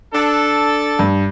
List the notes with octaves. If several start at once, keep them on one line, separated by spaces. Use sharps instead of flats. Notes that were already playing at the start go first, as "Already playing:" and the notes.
D4 A4
G2